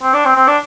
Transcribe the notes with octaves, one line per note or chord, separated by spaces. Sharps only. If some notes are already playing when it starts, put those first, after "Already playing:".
C4
D4
C4
C4
D4